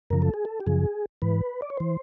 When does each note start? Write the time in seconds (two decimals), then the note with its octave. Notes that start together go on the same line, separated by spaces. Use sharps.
0.10 F#2 C#3 F3 A#4
0.22 A4
0.34 G#4
0.45 A4
0.60 G4
0.67 F#2 C#3 F3 G#4
1.22 G#2 E3 B4
1.62 D5
1.70 C#5
1.77 E3 C5